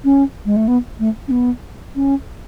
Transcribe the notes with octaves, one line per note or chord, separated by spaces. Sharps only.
C#4
G#3
A3
B3
A3
C#4
B3
C#4